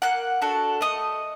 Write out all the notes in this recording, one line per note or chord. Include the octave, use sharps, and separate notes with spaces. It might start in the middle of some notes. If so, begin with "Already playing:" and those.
A#3 F#5 F#6
D4 F#4 A4
A3 D#5 D#6